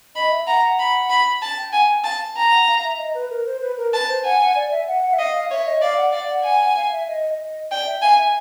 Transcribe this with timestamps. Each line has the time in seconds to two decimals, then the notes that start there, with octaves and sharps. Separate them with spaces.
0.16 D#5 B5
0.31 E5
0.47 F#5 A#5
0.62 F#5
0.78 B5
1.10 B5
1.42 A5
1.58 G5
1.72 F#5 G#5
1.88 G5
2.04 F5 A5
2.36 G5 A#5
2.51 F#5
2.68 F5
2.84 E5
2.98 D#5
3.14 B4
3.30 A#4
3.46 C5
3.61 B4
3.77 A#4
3.93 B4 A5
4.08 C5
4.24 F#5 G#5
4.40 F#5
4.55 D5
4.71 E5
4.88 F#5
5.03 F#5
5.13 E5
5.18 D#5 F5
5.34 F5
5.51 C#5 E5
5.66 D#5
5.81 D5 F5
5.97 F#5
6.13 D5 F5
6.29 F#5
6.44 F#5 G#5
6.60 F#5
6.76 F5
6.92 E5
7.08 D#5
7.38 D#5
7.71 D5 G5
7.86 E5
8.01 F5 G#5
8.18 E5